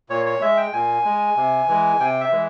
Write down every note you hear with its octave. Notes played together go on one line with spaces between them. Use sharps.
A#2 C#5
C#5
G#3 E5
G5
A#2 G#5
G#3
C3
E3 G#3
C3 G5
E5
E3 G#3